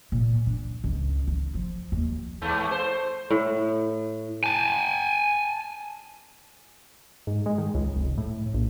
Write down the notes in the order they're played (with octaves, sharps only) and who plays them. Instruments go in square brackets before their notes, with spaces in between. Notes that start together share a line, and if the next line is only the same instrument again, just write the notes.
[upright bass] A#2
D4
C#2
D#3
F3
D#2
[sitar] E2 G#2 A3
C5
[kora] A2
[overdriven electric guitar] G#5 A5
[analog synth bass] G#2
G#3
D#3
C#2
F1
A2
A#1